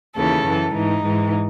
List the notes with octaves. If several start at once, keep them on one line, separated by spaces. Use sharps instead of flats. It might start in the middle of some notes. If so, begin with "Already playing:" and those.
D#2 C#3 E3 A4
F#2 E3
G#2 E3 D#4
G#2 E3